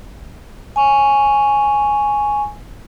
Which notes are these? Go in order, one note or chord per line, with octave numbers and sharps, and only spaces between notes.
G#5 C#6